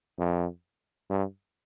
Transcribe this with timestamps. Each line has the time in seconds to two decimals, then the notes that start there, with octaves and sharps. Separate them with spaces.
0.19 F2
1.10 G2